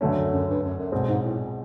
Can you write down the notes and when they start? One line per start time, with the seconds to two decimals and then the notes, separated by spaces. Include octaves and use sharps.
0.01 D2 G2 D3 F#3 A3 C#4
0.16 F#2
0.31 F#2
0.47 G2
0.62 F#2
0.77 F#2
0.92 B1 G2 B2 G#3 C4
1.07 G#2
1.23 A2
1.38 A#2